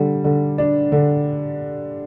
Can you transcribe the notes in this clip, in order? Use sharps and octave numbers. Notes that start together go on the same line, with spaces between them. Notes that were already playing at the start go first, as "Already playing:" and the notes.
Already playing: D3 G3
D3
D4
D3